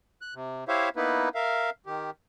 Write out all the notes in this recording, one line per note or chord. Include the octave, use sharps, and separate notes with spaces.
F#6
C3
E4 G4 C5 C#5 E5 F5
A#3 B3 D#4 E4 B4
A#4 E5 F5
D#3 G4